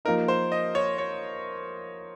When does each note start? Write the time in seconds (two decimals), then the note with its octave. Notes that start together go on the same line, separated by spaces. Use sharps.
0.05 F3 A#3 D#4 A#4
0.28 C5
0.52 D#5
0.75 C#5
0.98 C#5